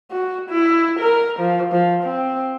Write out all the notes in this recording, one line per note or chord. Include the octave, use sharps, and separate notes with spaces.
F#4
E4
A#4
F3
F3
C4